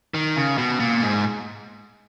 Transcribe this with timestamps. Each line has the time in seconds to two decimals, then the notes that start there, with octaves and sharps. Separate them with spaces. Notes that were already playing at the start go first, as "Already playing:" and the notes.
0.14 D#3
0.37 C#3
0.58 B2
0.79 A#2
1.01 G#2